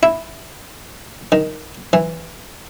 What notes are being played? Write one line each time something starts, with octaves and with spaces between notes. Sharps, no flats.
E4
D#3
E3